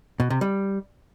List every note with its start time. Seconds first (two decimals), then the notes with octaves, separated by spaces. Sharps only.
0.20 B2
0.30 C3
0.41 G3